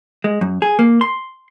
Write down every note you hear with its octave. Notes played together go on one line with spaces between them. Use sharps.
G#3
F#2
G#4
A#3
C6